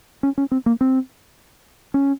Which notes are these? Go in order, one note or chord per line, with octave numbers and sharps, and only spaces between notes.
C#4
C#4
C4
A#3
C4
C#4